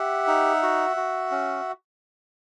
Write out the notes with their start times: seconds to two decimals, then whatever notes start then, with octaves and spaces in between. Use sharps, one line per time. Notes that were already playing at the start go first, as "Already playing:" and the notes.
Already playing: G4 E5 F#5
0.27 D#4
0.63 F#4
0.96 F#4
1.31 C#4